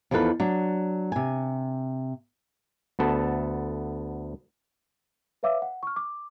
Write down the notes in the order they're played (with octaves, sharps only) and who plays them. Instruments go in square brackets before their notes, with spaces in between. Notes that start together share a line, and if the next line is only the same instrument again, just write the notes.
[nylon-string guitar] E2 F3 D#4 A4 B4
F#3 D4
C3 G#5
[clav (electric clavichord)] D2 B3 A4 A5
[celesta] B4 C#5 E5 F5 D6 E6
F#5
C#6 F6
D6